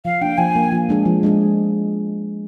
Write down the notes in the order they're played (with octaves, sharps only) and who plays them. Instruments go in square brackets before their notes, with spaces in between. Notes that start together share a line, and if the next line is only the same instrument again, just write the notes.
[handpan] F3 [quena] F5
[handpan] A#3 D4 [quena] G5
[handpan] F3 [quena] G#5
[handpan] A#3 D4
F3
G#3 D4 G#4
F3
G#3 D4 G#4